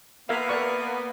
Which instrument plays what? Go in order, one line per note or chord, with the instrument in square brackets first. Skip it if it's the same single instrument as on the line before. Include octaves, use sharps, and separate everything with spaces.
[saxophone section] A#3 B3 [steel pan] A#4 E5 F5
[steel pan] A#4 D5 C#6